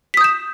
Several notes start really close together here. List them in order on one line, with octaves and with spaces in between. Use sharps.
B6 D#6 G6 E7